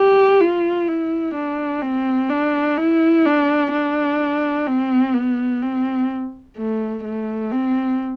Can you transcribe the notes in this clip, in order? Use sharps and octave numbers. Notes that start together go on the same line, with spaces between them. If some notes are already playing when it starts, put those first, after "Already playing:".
Already playing: G4
F4
E4
D4
C4
D4
E4
D4
D4
C4
B3
C4
A3
A3
C4